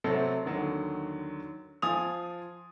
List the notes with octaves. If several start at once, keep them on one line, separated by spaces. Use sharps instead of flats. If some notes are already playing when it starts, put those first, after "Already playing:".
C3 F#3 A3 C4 A4
D#2 D3 D#3 F#3
F3 F4 G#5 D#6 F7